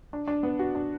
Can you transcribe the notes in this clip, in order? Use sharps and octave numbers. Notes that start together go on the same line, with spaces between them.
D4
D4
B3
F#4
D4